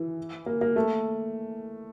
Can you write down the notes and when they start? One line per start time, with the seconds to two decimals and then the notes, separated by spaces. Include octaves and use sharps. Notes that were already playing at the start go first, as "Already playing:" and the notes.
Already playing: E3
0.46 A#3
0.61 A#3
0.76 A3